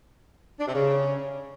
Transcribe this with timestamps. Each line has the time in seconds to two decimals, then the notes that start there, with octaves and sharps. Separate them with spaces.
0.59 D4
0.67 C3
0.74 C#3